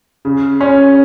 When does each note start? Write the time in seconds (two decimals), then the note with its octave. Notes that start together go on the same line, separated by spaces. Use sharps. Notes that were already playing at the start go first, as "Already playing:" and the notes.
0.25 C#3
0.60 C#4